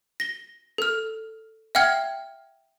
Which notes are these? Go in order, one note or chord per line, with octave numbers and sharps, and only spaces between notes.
A#6 G7
A4 F6
E5 F#5 G5 F6 G#6